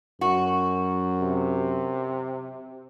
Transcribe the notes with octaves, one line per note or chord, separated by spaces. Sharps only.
F#2 F#4
C3